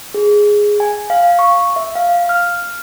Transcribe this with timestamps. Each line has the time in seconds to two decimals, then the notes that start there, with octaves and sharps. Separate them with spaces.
0.14 G#4
0.80 G#5
1.10 F5
1.39 C#6
1.76 E5
1.95 F5
2.29 F6